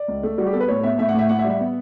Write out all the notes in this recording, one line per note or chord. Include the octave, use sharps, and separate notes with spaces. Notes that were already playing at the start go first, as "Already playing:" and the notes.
Already playing: D5
C#2
A3
G3 F#4
G4
B3 A4
B4
A2 C#5
B3 E5
A2 E5
F#5
A2 E5
A2 F#5
E5
G3
E5
B3